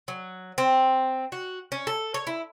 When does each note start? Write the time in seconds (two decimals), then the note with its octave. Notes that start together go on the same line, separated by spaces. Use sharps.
0.08 F#3
0.58 C4
1.32 F#4
1.72 C#4
1.87 A4
2.14 C#5
2.27 E4